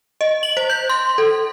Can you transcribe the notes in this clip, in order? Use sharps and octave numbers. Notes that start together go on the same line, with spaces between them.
D#5
F#7
C5
G6
C6
A4